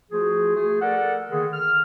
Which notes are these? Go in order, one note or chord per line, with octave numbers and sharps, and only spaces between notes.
F3 A3 F4 F#4 G#4
A3 G#4
A4 A#4 D5 F#5
D3 D#3 A#3 G#4
F6